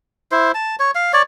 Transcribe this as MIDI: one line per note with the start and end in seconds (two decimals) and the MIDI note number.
0.32 0.52 64
0.32 0.52 72
0.55 0.76 81
0.80 0.91 73
0.95 1.12 77
1.13 1.22 73
1.13 1.22 74